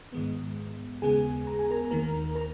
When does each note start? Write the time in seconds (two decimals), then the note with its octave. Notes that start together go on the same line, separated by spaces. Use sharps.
0.12 G#2 D#3 G#3 B3
1.02 D#2 C#3 G#3 B3 G#4 G#5
1.47 A#5
1.59 G#5
1.71 A#4 A#5
1.91 D#2 D#3 A#3 A#4 A#5
2.35 A#4 A#5